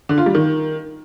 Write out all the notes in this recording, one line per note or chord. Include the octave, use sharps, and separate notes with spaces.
D3
F4
G3
D#3